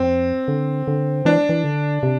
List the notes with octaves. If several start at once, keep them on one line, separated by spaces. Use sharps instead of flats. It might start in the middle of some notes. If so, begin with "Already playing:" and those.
Already playing: F2 C4
D3
D3
E3 D4
E3
D3
C3